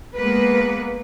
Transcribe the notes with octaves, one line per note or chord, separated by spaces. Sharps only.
G#3 A#3 B3 B4